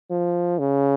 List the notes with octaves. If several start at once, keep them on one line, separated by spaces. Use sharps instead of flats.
F3
C#3